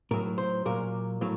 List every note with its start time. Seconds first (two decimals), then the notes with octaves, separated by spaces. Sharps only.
0.11 A2 F#3 A#4
0.38 C5
0.65 A#2 F#3 A#4
1.21 A2 F#3